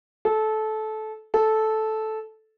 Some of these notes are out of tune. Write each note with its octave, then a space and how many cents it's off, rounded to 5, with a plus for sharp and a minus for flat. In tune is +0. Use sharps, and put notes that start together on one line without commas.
A4 -20
A4 -10